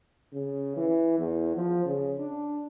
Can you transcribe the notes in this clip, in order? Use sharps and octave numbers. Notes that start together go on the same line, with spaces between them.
C#3
E3
E2
F3
C#3
D4